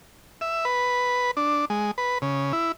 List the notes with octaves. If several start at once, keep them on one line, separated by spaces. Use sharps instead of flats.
E5
B4
D4
G#3
B4
C#3
E4